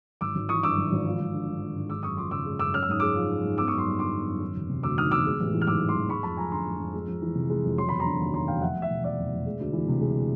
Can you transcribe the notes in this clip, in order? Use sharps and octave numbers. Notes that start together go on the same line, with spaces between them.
G#1 D6 E6
G#1
E3 C#6 D#6
G2 D6 E6
G#1
G#1
F3
G#1
D3
G2
F3
G#1
G#3 D6 E6
F#2 C#6 D#6
F3 C6 D6
C#3 D6 E6
G#3
F#2 D6 E6
C#4 F6
E6
G#2 D#6
G#3 D6 E6
F3
C#4
G#2
B3 D6 E6
F#2 C#6 D#6
C6 D6
G3
D3 C6 D6
B3
F#2
D#3
E1
C3
D2 D6 E6
D#3 D#6 F6
E1 D6 E6
G#3
A1
E3
F6
G#2 D6 E6
G#3
C6 D6
A1
G#3 B5 C#6
F2 A5 B5
F3 G#5 A#5
D3 A#5 C6
G#3
F2
G#3
F2
E3
C3
G#3
F2
F#3 C6
E1 B5
A#5 C6
D3
D#2
F#3 A#5 C6
E1 F5 G5
F1 E5 F#5
F1
E5 F#5
B2
E2 D5 E5
F1
F1
G#3
D2
E3
C3
G#3